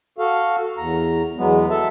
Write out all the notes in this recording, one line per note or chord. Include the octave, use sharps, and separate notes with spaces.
F#4 A4 F5
E2 A#5
E2 F#3 G#3 B3
A4 E5 A5